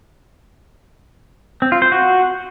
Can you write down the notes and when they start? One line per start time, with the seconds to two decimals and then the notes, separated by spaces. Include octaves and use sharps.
1.62 C4
1.72 F4
1.82 C5
1.92 F#4